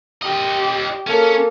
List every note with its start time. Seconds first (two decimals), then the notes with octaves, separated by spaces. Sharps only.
0.22 F4 G4 D#5
1.07 A#3 C#4 A4